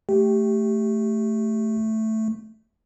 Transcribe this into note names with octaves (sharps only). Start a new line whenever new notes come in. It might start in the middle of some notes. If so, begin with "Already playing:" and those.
A3 G4